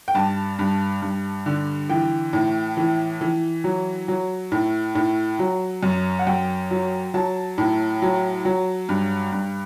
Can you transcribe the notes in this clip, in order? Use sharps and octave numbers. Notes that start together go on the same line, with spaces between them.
G5
G2 A5
G2
G2
D3
E3 G5
A2
E3
E3
F#3
F#3
A2
A2
F#3
F#2
F#5
F#2 G5
F#3
F#3 A5
A2
F#3
F#3
G2
G2